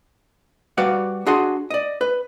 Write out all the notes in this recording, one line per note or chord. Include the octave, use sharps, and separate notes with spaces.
G3 F#4 B4 D5 F5 F#5
D4 F#4 G#4 F#5 G#5 C6
D5 D#5
B4